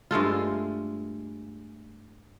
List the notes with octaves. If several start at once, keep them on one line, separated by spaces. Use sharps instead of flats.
G2 G#3 A3 F4